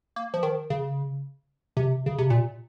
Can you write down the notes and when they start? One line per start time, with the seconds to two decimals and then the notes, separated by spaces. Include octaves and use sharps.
0.16 A#3
0.34 F3
0.43 D#3
0.70 C#3
1.77 C3
2.06 C#3
2.19 C3
2.30 A#2